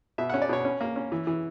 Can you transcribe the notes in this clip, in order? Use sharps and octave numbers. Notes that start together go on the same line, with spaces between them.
B2 E5
C#4 F#5
D5
B2 C#5
C#4
A#3
C#4
E3
E3